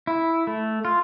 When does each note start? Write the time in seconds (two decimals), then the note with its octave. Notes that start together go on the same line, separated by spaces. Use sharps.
0.07 E4
0.47 A3
0.85 F4